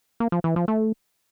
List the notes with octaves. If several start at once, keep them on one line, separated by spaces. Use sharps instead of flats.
A#3
F3
E3
F3
A3